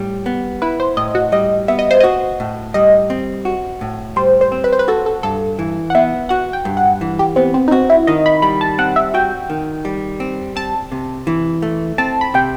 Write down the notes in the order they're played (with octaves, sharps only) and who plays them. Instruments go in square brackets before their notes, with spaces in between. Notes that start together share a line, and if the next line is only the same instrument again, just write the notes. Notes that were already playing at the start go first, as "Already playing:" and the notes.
Already playing: [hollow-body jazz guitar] A2 G3
B3
[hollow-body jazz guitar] E4 [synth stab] B4
[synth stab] C5
[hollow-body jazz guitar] A2 [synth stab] D#5
[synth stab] F#4
[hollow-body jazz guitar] G3 [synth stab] D#5
[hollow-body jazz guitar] B3 [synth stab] E5
[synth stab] D#5
C5
[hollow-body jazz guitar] F#4 [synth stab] D#5
[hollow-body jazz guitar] A2
[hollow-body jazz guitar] G3 [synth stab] D#5
[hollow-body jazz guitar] C4
F#4
A2
[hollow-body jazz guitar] G3 [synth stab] C5
[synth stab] C5
[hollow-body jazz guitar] C4
[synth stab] B4
C5
B4
[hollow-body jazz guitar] F#4 [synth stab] A4
[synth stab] A4
[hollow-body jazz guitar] G2 [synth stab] A4
[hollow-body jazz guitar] E3
[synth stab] F#5
[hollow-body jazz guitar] B3 [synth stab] E5
[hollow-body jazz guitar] F#4 [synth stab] F#5
[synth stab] G5
[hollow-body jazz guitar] G2
[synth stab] F#5
[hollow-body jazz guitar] E3
[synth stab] G4
[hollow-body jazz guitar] B3 [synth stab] C4
[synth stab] C4
D#4
[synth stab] C4 [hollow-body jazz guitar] F#4
[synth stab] E4
[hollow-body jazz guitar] D#3 [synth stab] D#5
[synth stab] B5
[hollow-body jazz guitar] G3 [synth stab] B5
[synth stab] A5
[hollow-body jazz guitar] C4 [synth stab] F#5
[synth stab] E5
[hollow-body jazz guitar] F#4 [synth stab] G5
[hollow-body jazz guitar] D#3
G3
C4
[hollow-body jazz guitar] C4 [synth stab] A5
[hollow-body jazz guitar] C3
E3
A3
[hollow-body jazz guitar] C4 [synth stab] A5
[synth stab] B5
[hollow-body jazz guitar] C3 [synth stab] G5